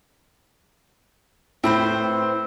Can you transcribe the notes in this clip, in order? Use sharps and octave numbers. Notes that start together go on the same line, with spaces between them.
A2 C4 B4 C5